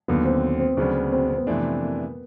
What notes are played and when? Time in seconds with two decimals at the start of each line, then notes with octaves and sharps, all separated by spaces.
0.08 D#2 D3 F#3 B3
0.25 C4
0.60 C4
0.77 D2 C#3 F#3 B3 C4 D4
1.12 C4
1.29 C4
1.38 B3
1.47 F2 C3 E3 A3 D4
1.81 A#3